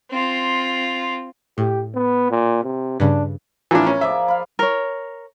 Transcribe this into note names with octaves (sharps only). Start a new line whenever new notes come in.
C4 F4
A2 G4
B3
A#2
C3
G2 C#3 D4
E3 F3 D4 E4 A#4
C#4 A#4
F3 G#4 D5 E5
F5 B5
A#4 C#5